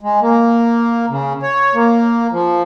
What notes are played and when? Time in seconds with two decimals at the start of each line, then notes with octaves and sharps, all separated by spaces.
0.01 G#3
0.22 A#3
1.09 C#3
1.43 C#5
1.75 A#3
2.32 F3